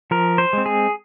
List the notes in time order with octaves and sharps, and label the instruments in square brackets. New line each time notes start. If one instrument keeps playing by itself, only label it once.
[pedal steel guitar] F3 A#4
C5
G#3 C4
G#4